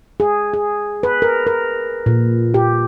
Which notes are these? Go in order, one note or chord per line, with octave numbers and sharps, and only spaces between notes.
G#4
G#4
B4
A#4
A#4
A#2
G4